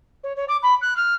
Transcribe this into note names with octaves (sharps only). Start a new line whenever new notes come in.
C#5
C#5
D6
B5
F#6
F6